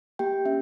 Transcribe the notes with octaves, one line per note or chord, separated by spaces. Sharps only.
A#3 G4 G5
C#4 E5